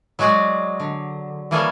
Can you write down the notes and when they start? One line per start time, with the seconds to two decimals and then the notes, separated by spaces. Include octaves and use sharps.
0.19 F#3 G#3 F#4 G#4 D5
0.80 D3
1.51 E3 G3 A#3 G#4 A4 C#5